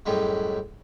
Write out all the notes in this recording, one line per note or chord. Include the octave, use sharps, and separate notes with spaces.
F#2 A2 G3 G#3